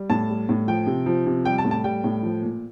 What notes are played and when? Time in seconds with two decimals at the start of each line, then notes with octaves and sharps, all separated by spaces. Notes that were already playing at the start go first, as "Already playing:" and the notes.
Already playing: G3
0.10 A2 A5
0.30 G3
0.49 A2
0.68 F3 G5
0.87 C3
1.06 F3
1.26 C3
1.45 G3 G5
1.58 A5
1.65 A2
1.71 A5
1.84 G3 G5
2.04 A2
2.23 F3
2.42 A#2